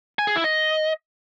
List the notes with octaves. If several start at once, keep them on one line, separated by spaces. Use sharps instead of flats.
G#5
G#4
E4
D#5